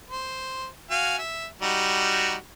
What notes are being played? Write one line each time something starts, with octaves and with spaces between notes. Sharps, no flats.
C5
F#4 F5 G#5
E5
G3 D#4 F#4